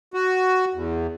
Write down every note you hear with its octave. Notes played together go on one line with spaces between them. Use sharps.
F#4
E2